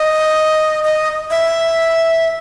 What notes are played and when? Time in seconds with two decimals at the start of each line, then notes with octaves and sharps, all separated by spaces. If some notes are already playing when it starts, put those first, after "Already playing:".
Already playing: D#5
0.84 D#5
1.31 E5